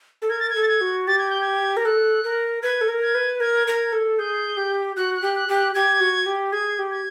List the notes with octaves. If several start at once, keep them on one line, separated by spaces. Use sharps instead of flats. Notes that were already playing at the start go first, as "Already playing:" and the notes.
A4
A#4 G#6
A6
G#6
A4
A6
G#6
F#4
G4 A6
G#6
G6
G#6
A#4
A4 F#6
A#4
B4 G#6
A4
A#4
G#6
B4
A#4 G#6
A#4
A4
G#4 G6
G4
F#4 F#6
F#6
G4
F#6
G4
F#6
G4 G#6
F#4
G4
G#4 G#6
G4
G#6